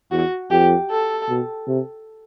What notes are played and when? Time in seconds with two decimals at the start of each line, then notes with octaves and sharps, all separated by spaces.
0.12 E2 F#4
0.51 F2 G4
0.91 A4
1.29 B2
1.68 C3